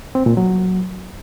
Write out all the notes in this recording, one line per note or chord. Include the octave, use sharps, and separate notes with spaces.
C4
A#2
F#3